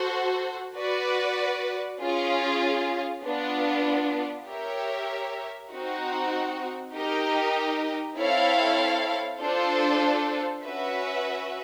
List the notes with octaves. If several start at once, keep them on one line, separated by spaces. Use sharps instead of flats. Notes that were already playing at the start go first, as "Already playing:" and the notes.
Already playing: F#4 A4 C5
F#4 B4 D5
C#4 F4 G#4
B3 D4 F4
G4 A#4 C#5 E5
C4 D#4 F#4
D#4 G4 A#4 D#5
C4 E4 A4 C#5 F5
D4 F4 A4 C5
C#4 F#4 B4 E5